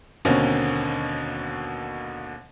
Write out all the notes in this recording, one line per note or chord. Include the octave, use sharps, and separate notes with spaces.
D#2 B2 D3 A#3 C4 C#4